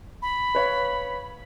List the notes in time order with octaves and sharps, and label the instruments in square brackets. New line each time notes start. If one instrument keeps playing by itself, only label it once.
[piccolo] B5
[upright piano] B4 C#5 F5